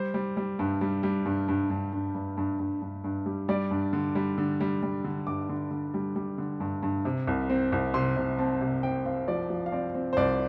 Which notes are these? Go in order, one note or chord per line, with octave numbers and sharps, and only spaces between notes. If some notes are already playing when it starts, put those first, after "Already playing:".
Already playing: G3 C5
G3
G3
G2
G3
G3
G2
G2
G2
G2
G2
G2
G2
G2
G2
G3
G3 D5
G2
D3
G3
D3
G3
G3
D3
G2 D6
D3
D3
G3
G3
D3
G2
G2
C3
C2
C4
C2
C3 C6
C3
C4 A5
C3
C4 G5
C4 F5
F3 D5
F3
F5
C4 D5
C4
C5
C2 D5